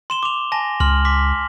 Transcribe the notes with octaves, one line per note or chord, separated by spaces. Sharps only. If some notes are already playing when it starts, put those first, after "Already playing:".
C6 E7 G7
D6 F7
G#5 A5 A#6
C#2 C6 F6 F#7
C6 D6 B6